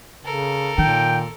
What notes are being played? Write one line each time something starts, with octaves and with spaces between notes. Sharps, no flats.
C#3 A4 A#4
A#2 D#3 G5